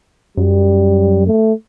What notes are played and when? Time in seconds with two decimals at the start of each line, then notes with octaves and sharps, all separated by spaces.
0.37 F#2 G3
1.27 A3